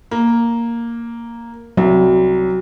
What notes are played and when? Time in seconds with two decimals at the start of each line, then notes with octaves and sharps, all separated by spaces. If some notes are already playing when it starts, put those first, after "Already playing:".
0.11 A#3
1.77 C2 F#3